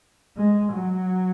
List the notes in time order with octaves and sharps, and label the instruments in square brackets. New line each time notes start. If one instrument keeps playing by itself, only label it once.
[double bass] G#3
F#3